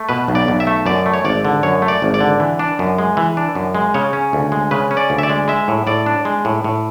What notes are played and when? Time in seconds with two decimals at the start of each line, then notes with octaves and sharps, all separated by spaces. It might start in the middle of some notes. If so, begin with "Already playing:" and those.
Already playing: A3
0.09 B2 B4
0.28 B1
0.35 D5
0.48 B1
0.60 E5
0.67 A3
0.86 F#2 D5
1.06 A3
1.14 C#5
1.25 G#1 D5
1.45 D3
1.63 F#2 C#5
1.82 A3
1.88 D5
2.02 G#1
2.14 D5
2.21 D3
2.40 E3
2.59 D4
2.79 F#2
2.98 G#3
3.17 E3
3.37 D4
3.55 F#2
3.75 G#3
3.94 C#3 C#5
4.13 C#4
4.33 D2
4.52 G#3
4.71 C#3 B4
4.91 C#4
4.97 D5
5.10 D2
5.19 E5
5.23 D5
5.30 G#3
5.48 G#3 E5
5.68 A2
5.87 A2 D5
6.06 D4
6.25 G#3
6.45 A2
6.64 A2